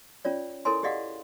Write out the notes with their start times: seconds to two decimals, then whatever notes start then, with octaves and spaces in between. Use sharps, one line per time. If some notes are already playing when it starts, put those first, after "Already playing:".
0.25 C#4 F4 C#5 D5
0.65 E4 A4 A#4 C#5 G#5 C6
0.83 G4 G#4 D5 D#5 F5 F#5